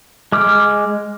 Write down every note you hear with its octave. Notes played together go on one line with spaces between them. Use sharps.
G#3 D6 F6